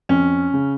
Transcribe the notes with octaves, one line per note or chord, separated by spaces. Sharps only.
F2 C#4
C#3